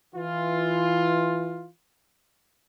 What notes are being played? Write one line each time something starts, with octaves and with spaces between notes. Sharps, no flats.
E3 F4